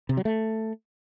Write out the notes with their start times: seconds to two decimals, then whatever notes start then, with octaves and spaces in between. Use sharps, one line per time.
0.09 C3
0.17 F#3
0.25 A3